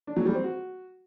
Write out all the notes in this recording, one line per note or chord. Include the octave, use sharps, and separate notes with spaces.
D4
F#3
G3
C4
F#4